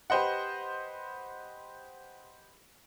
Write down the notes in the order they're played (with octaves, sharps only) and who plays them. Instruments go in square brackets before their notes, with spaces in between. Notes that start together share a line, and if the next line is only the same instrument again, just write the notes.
[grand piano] G4 B4 C5 D#5 F#5